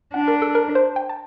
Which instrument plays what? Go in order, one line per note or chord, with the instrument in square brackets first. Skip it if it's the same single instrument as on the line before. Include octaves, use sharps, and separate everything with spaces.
[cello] D4 [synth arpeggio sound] F#5
[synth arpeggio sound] A#4
A4
A#4
C5
G5
A5